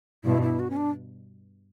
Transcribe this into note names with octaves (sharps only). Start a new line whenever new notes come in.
G2 B2 E4
E4
F#4
C#4
D4